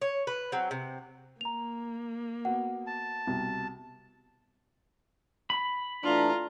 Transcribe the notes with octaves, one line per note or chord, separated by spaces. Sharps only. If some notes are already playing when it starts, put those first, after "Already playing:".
C#5
B4
F#3 C4
C3
A#3 A#5 F7
B3 F#4 F#5
A5
C2 B2
B5
E3 A3 D4 F4 A#5